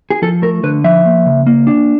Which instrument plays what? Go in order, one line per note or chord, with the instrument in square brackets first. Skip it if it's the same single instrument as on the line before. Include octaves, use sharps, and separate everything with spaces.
[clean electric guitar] G#4
F3 A4
A3 A#4
D3 B4
F3 E5
A#3
C#3
A#3
D4